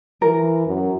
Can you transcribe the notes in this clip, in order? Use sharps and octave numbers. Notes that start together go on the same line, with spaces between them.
E3 A#4
F#2